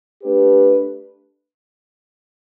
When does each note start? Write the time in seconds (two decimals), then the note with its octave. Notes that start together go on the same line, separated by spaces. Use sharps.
0.23 A3 D4 G4 B4